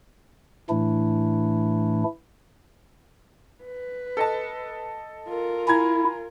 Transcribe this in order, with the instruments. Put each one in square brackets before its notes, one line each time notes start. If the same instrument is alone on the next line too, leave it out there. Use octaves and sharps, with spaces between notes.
[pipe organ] A2 E3 A3 D4 E4
[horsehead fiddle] B4
[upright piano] A4 D#5 A5
[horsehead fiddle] F4 A#4
[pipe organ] E4 [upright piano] G#5 A#5 G#6